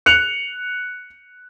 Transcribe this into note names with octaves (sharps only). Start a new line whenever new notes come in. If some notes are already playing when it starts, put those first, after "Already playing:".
F#6 C#7 F7